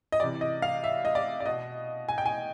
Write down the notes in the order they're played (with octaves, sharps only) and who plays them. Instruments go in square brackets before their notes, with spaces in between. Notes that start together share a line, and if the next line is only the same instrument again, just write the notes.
[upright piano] D#5
C3 E3 D5
D#5
F5
E5
D#5
D5
D5
B2 D#5
G#5
G5
G#5